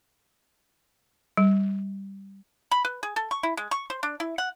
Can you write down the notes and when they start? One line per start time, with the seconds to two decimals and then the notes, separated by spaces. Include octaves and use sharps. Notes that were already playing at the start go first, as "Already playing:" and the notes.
1.37 G3
2.71 B5
2.85 B4
3.03 G#4
3.16 A4
3.31 C#6
3.43 E4
3.57 G#3
3.71 C#6
3.90 C5
4.03 D4
4.20 E4
4.38 F#5